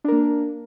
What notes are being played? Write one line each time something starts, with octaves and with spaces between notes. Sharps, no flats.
A#3 D4 A#4